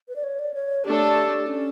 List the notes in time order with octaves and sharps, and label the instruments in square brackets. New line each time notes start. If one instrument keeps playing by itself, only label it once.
[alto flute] B4
D5
C#5
D5
C#5
[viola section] A3 D4 A4 [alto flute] G4
[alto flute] C#4